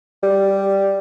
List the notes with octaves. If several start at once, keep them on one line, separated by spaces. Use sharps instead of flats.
G3